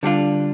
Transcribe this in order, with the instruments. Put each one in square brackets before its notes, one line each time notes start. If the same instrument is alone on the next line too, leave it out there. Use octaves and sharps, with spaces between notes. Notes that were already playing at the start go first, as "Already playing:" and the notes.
[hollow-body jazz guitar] D3 G3 D4 F4